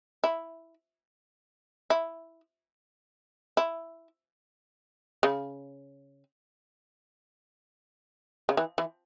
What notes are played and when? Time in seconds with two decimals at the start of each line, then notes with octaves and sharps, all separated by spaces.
0.24 E4
1.90 E4
3.57 E4
5.23 C#3
8.49 C#3
8.57 E3
8.78 E3